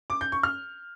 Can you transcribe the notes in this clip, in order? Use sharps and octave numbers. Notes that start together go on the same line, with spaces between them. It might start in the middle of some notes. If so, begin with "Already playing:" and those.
D6
G6
C#6
F6